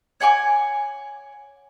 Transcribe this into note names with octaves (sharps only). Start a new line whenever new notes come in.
C#5 F#5 G#5 D6